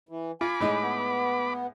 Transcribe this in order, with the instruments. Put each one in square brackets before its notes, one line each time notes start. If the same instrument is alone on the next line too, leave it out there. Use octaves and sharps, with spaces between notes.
[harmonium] E3
[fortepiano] F4 [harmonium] G#5 [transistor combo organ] B5 D6
[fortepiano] A2 G#3 D#4
[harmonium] B3